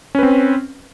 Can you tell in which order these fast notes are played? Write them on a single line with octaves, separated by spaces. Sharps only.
C#4 B4 C4